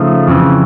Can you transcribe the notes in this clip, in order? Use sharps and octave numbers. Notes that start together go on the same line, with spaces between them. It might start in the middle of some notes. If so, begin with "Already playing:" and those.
Already playing: C#3 F3 A3 D#4 F4
F2 C#3 E3